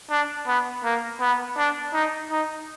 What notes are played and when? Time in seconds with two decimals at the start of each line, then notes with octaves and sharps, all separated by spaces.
0.11 D4
0.47 B3
0.84 A#3
1.20 B3
1.57 D4
1.94 D#4
2.31 D#4